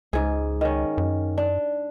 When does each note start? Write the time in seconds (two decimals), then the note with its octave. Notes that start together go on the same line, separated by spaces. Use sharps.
0.13 C#2 G#2 G#4
0.61 D#3 C#4
0.98 F#2
1.38 D4